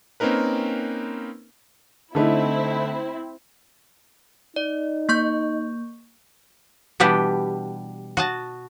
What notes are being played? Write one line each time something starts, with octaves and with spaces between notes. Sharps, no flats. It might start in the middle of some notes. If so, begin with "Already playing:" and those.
A#3 C4 C#4 D#4 A#4 B4
D3 A3 C4 D#4 E4
D#4 D5
A#3 C#6 G6
B2 E3 G3 B3 D4 G4
F#4 D#5 A5